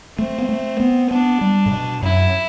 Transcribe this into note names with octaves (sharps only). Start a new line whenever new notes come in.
A3 C4
B3
A3
B3
B3 D4
G3
A2
B2
F#2 E4